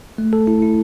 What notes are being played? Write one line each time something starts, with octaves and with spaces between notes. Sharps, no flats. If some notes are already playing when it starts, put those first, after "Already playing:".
A3
A4
E4
E4